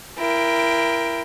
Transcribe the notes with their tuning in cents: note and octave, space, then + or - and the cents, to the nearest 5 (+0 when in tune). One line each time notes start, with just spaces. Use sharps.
E4 +30 A#4 +20 G5 +15